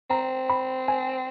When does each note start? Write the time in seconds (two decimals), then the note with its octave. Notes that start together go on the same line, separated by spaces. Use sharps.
0.10 C4 A#5
0.50 B5
0.88 G#5